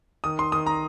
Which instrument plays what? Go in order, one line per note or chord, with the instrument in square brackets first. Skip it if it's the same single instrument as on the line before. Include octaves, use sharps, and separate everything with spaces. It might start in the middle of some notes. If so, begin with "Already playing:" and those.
[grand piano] D#3 D#6
C6
D#3 D#6
A#5